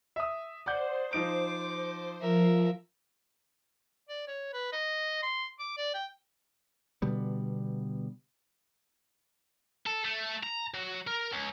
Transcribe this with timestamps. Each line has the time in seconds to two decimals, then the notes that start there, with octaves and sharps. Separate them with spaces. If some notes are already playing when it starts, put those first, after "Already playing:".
0.16 E5 D#6
0.66 C5 D5 F#5 G6
1.13 F3 D#4 D6 D7
2.21 F3 A#4 E5
4.09 D5
4.27 C#5
4.53 B4
4.73 D#5
5.23 C6
5.59 D6
5.77 D5
5.94 G5
7.02 B2 D3 G3 B3
9.86 A4
10.05 A3
10.43 A#5
10.74 F#3
11.07 A#4
11.32 C#2